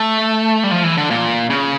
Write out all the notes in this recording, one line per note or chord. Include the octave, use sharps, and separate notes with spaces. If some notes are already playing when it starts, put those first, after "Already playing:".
Already playing: A3
G3
F3
E3
D3
A#2
C#3